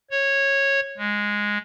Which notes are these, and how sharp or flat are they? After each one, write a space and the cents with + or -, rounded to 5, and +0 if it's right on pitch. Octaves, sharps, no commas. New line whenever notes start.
C#5 -10
G#3 -5